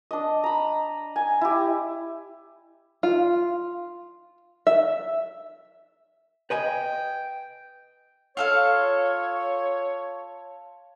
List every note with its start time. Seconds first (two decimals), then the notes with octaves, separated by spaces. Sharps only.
0.11 D4 D#5
0.44 A#5 B5
1.16 G#5
1.41 E4 G4
3.03 F4
4.67 E5
6.50 B4 D#5 G5 G#5
8.37 F4 A4 C#5 F5